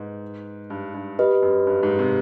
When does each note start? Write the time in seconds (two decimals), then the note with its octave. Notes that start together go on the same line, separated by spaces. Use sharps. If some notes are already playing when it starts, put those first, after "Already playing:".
Already playing: G#2 B4 D#5
0.70 G2
0.94 G2
1.19 G4 B4 D#5
1.42 F#2
1.67 G2
1.83 G#2
1.99 C3